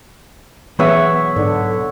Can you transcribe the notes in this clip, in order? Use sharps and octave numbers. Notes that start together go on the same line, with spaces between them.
B1 E3 B3 G#4 B4 C#5 E5 F#5
G#2 D3